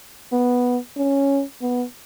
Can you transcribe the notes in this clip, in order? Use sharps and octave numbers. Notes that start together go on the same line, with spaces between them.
B3
C#4
B3